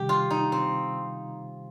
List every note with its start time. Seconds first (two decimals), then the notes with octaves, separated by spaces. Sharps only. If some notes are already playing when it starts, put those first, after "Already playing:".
Already playing: C3 D#3 G3 G4
0.09 F4
0.30 D#4
0.52 C4